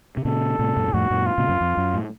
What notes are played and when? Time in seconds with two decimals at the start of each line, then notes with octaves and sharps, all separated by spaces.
0.17 C3
0.25 A#2 C#3 A4
0.59 A2 C3
0.77 F#2 A#2
0.88 A#2
0.93 F2 A2 F#4
1.10 F#2 A#2
1.26 F4
1.38 A#2 C#3
1.49 F#2
1.61 F2
1.77 F#2
1.94 A2